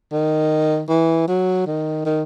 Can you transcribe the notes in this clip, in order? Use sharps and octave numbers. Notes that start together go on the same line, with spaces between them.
D#3
E3
F#3
D#3
D#3